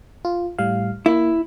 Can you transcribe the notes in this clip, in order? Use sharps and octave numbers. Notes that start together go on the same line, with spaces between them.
F4
A2 G3 F5
A#3 E4